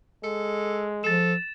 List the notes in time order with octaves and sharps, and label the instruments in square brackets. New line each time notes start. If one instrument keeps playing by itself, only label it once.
[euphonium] G#3 [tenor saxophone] A4
[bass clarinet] F3 [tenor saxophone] A4 [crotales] A6 E7